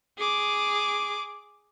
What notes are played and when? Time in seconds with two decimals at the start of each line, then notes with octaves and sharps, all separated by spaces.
0.18 G#4 D6